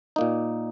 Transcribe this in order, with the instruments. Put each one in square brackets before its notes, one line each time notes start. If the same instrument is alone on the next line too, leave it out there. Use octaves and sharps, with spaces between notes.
[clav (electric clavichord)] A#2 A#3 D#4